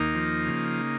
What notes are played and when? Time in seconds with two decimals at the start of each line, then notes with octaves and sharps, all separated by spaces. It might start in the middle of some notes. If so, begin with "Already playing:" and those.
Already playing: D#2 A#3 D#4
0.15 F3
0.46 C#3